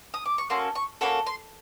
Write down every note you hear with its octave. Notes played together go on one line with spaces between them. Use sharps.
D#6
D6
C#6
A#3 C#4 F#4 A4 C6
C#6
A#3 C#4 F#4 A4 B5
C6